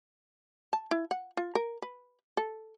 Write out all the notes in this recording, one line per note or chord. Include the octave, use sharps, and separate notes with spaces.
A5
E4
F#5
F4
A#4
B4
A4